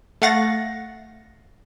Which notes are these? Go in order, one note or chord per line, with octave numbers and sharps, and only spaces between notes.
A3 F5 F#5 A6 A#6